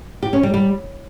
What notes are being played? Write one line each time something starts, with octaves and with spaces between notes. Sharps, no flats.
G4
C#4
G3
G3